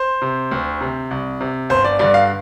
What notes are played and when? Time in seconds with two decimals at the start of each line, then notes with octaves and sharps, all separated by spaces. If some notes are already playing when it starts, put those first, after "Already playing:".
Already playing: C5
0.22 C3
0.51 D2
0.81 C3
1.11 C2
1.41 C3
1.70 G1 C5
1.84 D5
1.99 G2 D3 D5
2.14 F5